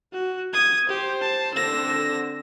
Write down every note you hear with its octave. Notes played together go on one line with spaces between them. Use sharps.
F#4
D#6 G#6
G4 C5
A5
D3 C4 E6 A#6